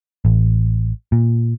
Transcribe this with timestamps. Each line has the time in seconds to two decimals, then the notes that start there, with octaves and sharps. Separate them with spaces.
0.25 A1
1.12 A#2